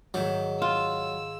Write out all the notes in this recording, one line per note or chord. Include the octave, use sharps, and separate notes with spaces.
G#2 D#3 F#3 E5
F4 E6